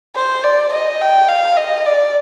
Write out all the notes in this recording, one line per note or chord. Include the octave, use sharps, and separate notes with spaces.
C5
D5
D#5
G5
F5
D#5
D5